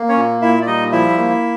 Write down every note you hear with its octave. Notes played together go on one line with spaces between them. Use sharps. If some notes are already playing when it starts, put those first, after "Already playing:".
Already playing: A#3
C#4 C#5
A#2
A#2 E4 E5
D5
G3 D#4 D#5
F3 E4 E5
A#3